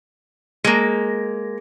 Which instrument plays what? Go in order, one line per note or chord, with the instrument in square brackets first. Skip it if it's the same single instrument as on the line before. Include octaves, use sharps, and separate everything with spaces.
[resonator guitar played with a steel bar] G#3 A#3